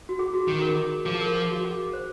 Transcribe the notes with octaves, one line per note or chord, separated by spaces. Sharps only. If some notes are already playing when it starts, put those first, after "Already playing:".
F#4
G#4
F#4
D#3 G#4
A#4
G#4
F3 G#4
A#4
G#4
F#4
G#4
C5